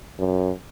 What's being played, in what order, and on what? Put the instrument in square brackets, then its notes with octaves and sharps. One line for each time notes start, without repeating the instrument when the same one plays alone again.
[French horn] F#2